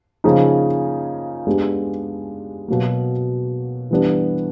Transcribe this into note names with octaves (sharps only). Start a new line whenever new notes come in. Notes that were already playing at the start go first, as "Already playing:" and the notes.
C#3 F3 A#3 D#4 G#4
G#3 B3 D4 G4
B2 F#3 A#3
E3 G3 B3 D4